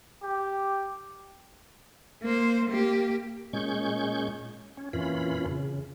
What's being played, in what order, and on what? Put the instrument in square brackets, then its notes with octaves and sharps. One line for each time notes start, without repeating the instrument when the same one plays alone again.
[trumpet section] G4
[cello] A#3 C5
A#3 G4
[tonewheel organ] A#2 G#3 C#4 C#6 G6
C#4
F2 A#2 E3 C#4 F4 B5
C#3